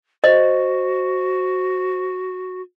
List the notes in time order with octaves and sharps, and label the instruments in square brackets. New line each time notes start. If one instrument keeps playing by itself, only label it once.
[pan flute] F#4 [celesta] C5 [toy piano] D#5